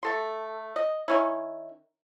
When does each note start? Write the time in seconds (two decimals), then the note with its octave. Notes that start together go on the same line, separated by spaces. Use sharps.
0.03 A3 A4 C6
0.76 D#5
1.08 D#3 C#4 E4